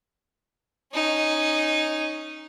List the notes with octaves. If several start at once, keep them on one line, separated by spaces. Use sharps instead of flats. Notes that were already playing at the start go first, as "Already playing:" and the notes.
C#4 D#4